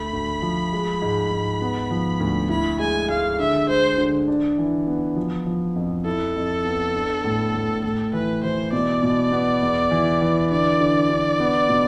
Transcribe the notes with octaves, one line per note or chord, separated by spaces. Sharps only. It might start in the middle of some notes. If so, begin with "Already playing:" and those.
Already playing: D2 A3 B5
D2
F3
G#3
G#2
G#2
B3
F3
D2
E4 B5
G#3 G#5
G#3 F5
D3 E5
G#3 C5
D3
D4
E3
B3
F3
F3
F2
E4 A4
F2
B3
D4
A2
A2
A2 A4
E3 B4
E3 C5
B2 D5
B2
B3
E2
E3
E3
D3 D5
D3
D3
B3
B2